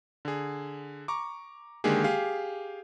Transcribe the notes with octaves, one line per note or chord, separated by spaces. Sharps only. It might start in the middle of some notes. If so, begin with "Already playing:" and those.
D3 G#4
A#5 C#6 D6
D3 D#3 G#3 A#3 G4 G#4
G4 G#4 F5